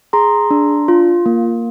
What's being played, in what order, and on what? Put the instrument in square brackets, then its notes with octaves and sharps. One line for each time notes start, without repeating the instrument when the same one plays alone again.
[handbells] G#4 A#5 C6
D4
F4
A#3